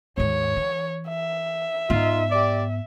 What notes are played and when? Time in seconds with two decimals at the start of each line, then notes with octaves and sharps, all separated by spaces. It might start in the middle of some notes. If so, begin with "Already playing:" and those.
0.18 D#2 G#2 C#5
0.56 E3
1.08 E5
1.90 G#2 B3 D#4 F4
2.31 G4 D5